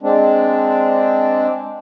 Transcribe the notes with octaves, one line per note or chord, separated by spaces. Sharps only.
G#3 C4 D4